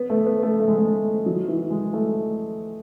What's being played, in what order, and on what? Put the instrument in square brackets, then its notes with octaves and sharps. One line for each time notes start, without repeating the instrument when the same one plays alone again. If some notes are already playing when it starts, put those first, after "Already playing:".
Already playing: [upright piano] B3
A3
B3
A3
A3
G#3
A3
F#3
E3
G#3
A3